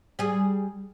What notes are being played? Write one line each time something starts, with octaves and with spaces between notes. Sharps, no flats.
G3 G#4